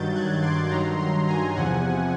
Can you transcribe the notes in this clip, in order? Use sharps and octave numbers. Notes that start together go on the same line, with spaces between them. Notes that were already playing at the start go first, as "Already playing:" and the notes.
Already playing: G2 D#3 F#3 G6 A6
F#6 G#6
C6 D6
G2 D#3 F#3 A#5 C6
A#5 C6
G#5 A#5
E2 C3 F3 F#5 G#5